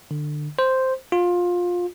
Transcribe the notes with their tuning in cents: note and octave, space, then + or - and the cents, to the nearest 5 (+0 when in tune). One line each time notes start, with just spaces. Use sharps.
D3 +25
C5 -5
F4 +20